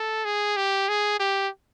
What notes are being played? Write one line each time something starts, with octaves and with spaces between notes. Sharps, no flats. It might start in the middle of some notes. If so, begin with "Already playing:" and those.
Already playing: A4
G#4
G4
G#4
G4